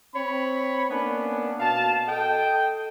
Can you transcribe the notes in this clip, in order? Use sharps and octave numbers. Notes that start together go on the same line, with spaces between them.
C4 C#5 B5
A#3 B3 C#4 D4
B2 F5 A5
A4 D#5 G5